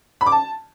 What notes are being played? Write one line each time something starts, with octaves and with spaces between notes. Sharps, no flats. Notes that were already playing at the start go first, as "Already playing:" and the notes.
B5
D6
A5